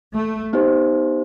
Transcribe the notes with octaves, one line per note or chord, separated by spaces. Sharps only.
A3
B3 D#4 G4 C5